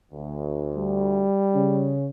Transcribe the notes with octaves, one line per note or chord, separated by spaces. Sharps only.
D2
G3
C#3 C#4